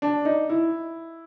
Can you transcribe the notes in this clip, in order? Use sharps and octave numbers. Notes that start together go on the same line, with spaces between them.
D4
D#4
E4